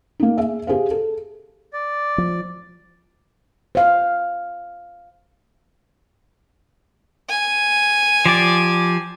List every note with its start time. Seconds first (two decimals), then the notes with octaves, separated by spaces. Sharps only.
0.20 A#3 D#4
0.38 G#4 E5
0.67 G4 G#4 C5 F5
0.91 A4
1.73 D5
2.18 F3
3.75 C5 F5
7.29 G#5
8.26 F3 G4 D5